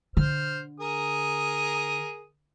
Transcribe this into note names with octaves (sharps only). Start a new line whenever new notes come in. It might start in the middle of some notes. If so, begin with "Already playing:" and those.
D3 C5 F6
G#4 A#4 D#6